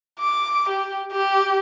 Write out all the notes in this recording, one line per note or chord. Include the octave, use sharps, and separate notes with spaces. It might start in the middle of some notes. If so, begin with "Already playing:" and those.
D6
G4
G4